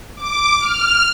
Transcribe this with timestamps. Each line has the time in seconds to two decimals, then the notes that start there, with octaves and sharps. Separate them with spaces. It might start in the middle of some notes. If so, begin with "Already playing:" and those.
0.15 D6
0.59 F6